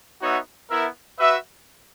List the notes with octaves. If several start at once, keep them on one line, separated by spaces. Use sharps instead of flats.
B3 D#4 F#4 C#5 E5
B3 E4 A#4 E5
F#4 B4 E5